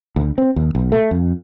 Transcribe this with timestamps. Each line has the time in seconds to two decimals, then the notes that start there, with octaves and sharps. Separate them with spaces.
0.16 D2
0.38 C4
0.56 D#2
0.75 B1
0.92 A3
1.11 F2